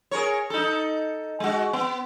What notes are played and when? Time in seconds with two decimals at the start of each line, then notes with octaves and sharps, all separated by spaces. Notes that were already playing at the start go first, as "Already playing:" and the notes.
0.11 G#4 A#4 C#5
0.50 D#4 A4
1.40 G#3 F#4
1.73 B3